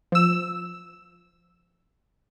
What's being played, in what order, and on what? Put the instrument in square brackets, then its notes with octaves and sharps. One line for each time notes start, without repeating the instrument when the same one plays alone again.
[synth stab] F3 E6